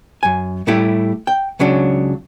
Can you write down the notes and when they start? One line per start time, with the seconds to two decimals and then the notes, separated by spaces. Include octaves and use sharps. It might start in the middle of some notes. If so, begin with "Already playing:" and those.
0.23 F#2 G#5
0.67 A2 G3 A3 E4 G4
1.27 G5
1.59 C#2 C#3 F#3 D4